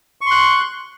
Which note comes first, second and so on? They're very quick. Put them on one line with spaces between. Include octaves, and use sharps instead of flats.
C#6 C6 F#6